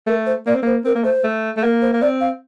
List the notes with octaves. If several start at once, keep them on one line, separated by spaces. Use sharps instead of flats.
A3 A#4
C5
A#3 D5
C4
A#3 C5
C4 A#4
A#3
A3 C5
A3
A3
A#3 A#4
C5
A#3
C4 D5
F5